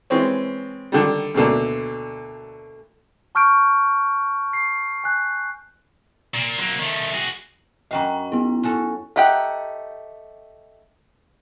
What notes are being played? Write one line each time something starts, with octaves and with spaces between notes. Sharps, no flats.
E3 G#3 C4 C#4
D3 D#3 G3
D2 B2 D3 A#3
A5 C#6 F6 G6 D7
C7
G#5 F#6 G6
A#2
F#3 A#3
D#3 A3
F#4 G#4
F#2 F#4 D#5 F5 G5 A#5
B3 E4
C#4 F#4 A4
A3 D#4 G4 F#5 G5